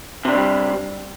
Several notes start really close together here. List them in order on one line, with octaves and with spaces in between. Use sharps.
C3 D4 C4 G3